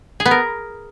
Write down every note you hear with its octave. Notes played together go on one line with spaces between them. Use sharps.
G#4
B3
A#4